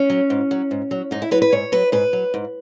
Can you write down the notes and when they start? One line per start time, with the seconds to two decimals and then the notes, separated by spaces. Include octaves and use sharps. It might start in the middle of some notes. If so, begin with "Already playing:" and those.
Already playing: C#4
0.10 F#3
0.30 G#2
0.51 F#3
0.71 G#2
0.91 F#3
1.11 G#2 D#4
1.22 E4
1.31 F#3 B4
1.42 B4
1.52 G#2 C#5
1.72 F#3 B4
1.92 G#2 B4
2.13 F#3
2.34 G#2